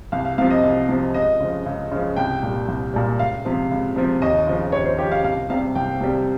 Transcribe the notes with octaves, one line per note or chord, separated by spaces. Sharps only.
C2 F5
F5
C3 F3 F5
D#5
C2
C3 F3
C#2 D#5
C#3 F3
C#2
C#3 F3
C2 G5
A#2 G3
C2
A#2 G3
C#2 F5
C3 F3
C#2
C3 F3
D#2 D#5
C#3 F3
D#2 C#5
C5
C#3 F3 G4
F5
C2 F5
C3 G3 F5
C2 G5
C3 G3